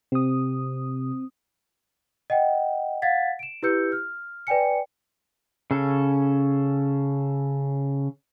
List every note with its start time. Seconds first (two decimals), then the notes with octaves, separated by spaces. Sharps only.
0.12 C3 C4 D#6
2.30 D#5 F#5 G5
3.02 F5 F#5 G#6 A6 B6
3.39 D7 E7
3.63 E4 G4 B4 E6 G6 C#7
3.92 F6
4.47 B4 D5 G5 G#5 C#7
5.71 C#3 C#4 A4